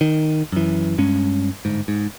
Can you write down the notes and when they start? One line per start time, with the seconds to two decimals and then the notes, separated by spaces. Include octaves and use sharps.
0.01 D#3
0.52 F#2 E3
0.98 G2 G#3 C#4
1.65 G1 G#2
1.88 G#2